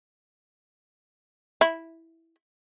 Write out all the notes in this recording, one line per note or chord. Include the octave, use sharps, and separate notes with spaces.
E4